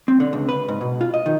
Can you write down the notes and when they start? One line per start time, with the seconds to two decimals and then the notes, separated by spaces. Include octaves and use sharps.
0.08 C4
0.20 D3
0.33 C#2
0.49 B4
0.68 G#2
0.81 B2
1.01 F4
1.14 D#5
1.26 D#3